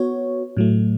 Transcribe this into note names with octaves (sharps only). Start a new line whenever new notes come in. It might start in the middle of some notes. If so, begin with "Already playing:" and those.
Already playing: B3 F#4 C#5
A2 F#3 A3